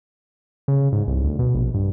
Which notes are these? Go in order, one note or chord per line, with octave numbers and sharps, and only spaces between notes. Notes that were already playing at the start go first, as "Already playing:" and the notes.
C#3
G#2
C2
D2
B2
A#1
G2